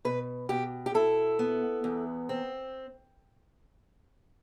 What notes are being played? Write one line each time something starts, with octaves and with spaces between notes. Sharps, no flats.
B2 B4
B2 G4
G4
E4 A4
B3
E2
C4